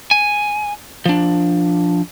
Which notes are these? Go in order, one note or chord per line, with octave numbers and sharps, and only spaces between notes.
G#5
F3 D4